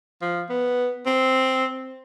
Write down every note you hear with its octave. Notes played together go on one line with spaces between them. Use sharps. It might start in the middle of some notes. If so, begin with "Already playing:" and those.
F3
B3
C4